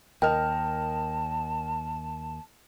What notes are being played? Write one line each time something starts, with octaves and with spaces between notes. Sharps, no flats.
D#2 A#4 D#5 G5 A5 F6